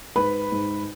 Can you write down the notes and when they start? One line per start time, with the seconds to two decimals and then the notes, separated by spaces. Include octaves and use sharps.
0.16 G#2 B4 B5
0.52 G#2